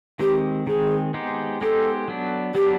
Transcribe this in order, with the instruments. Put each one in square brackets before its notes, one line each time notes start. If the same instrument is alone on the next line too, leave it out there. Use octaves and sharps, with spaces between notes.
[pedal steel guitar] D#3 G#3 C4 [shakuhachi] G4
[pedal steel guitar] D#3 G#3 C4 [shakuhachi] G#4
[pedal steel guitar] G#3 B3 D#4 G4 C5
[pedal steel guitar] G#3 B3 D#4 G4 C5 [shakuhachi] A4
[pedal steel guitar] F#3 B3 D4
[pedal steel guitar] F#3 B3 D4 [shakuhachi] G4